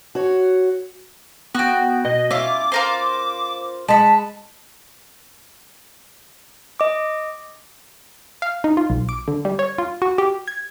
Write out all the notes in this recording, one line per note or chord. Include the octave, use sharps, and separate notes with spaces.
F#4 C#5
B3 F#4 G5
B2 D#5
C#4 E4 F4 D6
F4 A#4 C5
G#3 D#5 F#5 A5 B5
D#5 D6
F5
D#4
F4
B1
D6
D3
G3
C#5
F4
F#4
G4
G#6